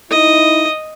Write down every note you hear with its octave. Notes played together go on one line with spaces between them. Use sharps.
D#4 E4 D#5